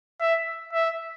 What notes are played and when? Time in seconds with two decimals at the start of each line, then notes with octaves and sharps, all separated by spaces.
0.21 E5
0.73 E5